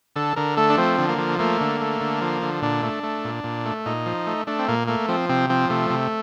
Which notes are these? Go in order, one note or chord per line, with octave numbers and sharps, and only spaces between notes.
D3 A4
D3 A#4
A3 A4
D4
F3 C4
D3
A#3
F3
A3 A#3
D3
A3
D3
F3
D3
A#2 D4
A3
A3
A#2
A#2
A3
A#2 D#4
F3
A3
A3 D4
C4
A#2 A#3
A3 A#3
F3 C4
C3 C4
F3 C4
C3 A3
C3